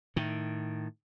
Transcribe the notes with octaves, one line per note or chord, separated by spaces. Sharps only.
A2 D#3